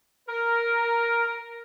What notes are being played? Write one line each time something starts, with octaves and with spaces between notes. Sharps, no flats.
A#4